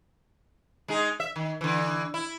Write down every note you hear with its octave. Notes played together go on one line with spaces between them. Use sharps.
G#3 D#4 G#4
E5
D#3
D3 E3
E4